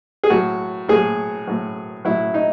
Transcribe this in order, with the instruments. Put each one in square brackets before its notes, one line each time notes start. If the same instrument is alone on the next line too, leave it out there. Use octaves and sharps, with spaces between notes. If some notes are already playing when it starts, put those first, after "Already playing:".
[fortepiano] G#4
A2 F#3 F#4
A2 F#3 G#4
A2 F#3
A2 F#3 E4
D#4